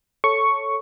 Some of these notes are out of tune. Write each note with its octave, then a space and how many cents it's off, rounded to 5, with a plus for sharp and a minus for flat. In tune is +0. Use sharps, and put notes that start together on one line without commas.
A4 +0 C#5 +0 C#6 +0